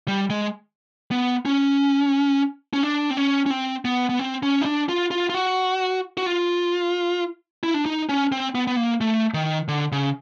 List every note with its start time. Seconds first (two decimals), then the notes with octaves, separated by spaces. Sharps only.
0.08 G3
0.30 G#3
1.11 B3
1.45 C#4
2.73 C#4
2.83 D4
3.10 C4
3.17 C#4
3.46 C#4
3.51 C4
3.85 B3
4.09 B3
4.19 C4
4.43 C#4
4.61 D#4
4.66 D4
4.89 F4
5.11 F4
5.30 F4
5.34 F#4
6.17 F#4
6.26 F4
7.63 E4
7.74 D4
7.86 D#4
8.09 C#4
8.32 C4
8.55 B3
8.67 B3
8.77 A#3
9.01 A3
9.34 D#3
9.68 D3
9.92 C#3